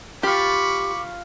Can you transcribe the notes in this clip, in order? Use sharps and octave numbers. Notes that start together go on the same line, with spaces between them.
F4 G4 F5 B5 C#6 D6